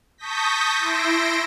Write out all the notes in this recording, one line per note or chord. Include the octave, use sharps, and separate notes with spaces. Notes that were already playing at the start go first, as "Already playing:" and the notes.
A5 C#6 D#6 G6 A#6 B6
E4 C6 E6 A#6 D7